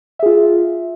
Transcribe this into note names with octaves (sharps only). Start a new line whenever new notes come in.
F4 G#4 E5